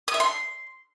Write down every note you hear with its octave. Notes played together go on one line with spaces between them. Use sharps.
D#6
E5
C6